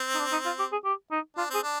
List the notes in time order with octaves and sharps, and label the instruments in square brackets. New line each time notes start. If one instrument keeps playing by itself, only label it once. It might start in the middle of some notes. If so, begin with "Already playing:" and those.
Already playing: [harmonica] C4
[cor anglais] D#4
D4
D#4
F4
G4
G#4
G4
D#4
[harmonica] D4 [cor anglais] F4
[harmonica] C4 [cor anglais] G#4
[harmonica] D4